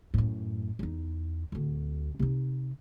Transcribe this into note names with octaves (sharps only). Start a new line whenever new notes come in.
F#2 A2
E2 D#4
D1 D2
C3 D#4